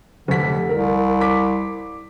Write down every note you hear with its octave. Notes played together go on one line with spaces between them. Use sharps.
F1 D3 B6
C2 A#4
D6 B6